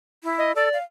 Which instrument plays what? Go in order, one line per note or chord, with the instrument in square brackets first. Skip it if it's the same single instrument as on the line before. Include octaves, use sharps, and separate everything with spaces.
[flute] E4
[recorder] D#5
[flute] A4 [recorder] D5
[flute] F5